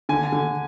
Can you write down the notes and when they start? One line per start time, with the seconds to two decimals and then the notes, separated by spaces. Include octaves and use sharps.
0.09 D3 G#5
0.32 D3